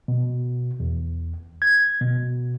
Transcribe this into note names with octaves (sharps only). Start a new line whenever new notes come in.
B2
E2
G#6
B2